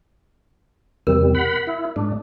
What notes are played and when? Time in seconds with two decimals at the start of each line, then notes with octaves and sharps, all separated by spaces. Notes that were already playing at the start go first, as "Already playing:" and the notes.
1.07 E2 C3 G3 A#4
1.35 F#5 B5
1.67 E4
1.96 G#2 D4